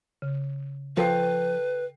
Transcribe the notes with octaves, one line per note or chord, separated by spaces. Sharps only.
C#3
F3 A4 B4 G5 C7